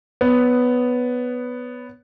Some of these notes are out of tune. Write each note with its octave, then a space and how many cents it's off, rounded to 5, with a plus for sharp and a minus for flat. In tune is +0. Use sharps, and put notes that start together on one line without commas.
B3 +5 C#5 +20